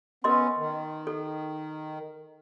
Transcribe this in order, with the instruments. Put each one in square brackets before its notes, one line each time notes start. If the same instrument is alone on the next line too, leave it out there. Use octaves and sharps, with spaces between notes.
[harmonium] B3 C#4 [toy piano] A#4 D#5 C6
[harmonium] D#3
[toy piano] A4